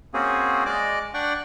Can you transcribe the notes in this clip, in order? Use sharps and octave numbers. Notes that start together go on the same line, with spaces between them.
A#3 C4 C#4 F#4 G#4
G#3 D5 D#5 D6
D4 D5 F#5 G5 C#6